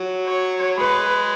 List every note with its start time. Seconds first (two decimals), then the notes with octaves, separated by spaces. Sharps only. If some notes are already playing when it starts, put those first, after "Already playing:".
Already playing: F#3
0.27 C#5
0.78 G#3 B4